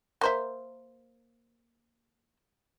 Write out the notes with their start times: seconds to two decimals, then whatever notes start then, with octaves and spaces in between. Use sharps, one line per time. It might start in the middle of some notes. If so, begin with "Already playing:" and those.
0.21 A#3 C5 E5